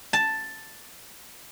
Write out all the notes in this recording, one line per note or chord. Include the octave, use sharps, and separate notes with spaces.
A5